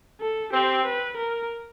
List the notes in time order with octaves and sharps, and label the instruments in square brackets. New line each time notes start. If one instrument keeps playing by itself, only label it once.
[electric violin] A4
[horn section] C4 [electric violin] G4
[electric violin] B4
A#4